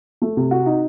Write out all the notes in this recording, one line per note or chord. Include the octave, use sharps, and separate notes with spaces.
A3
C3
F#4
D#4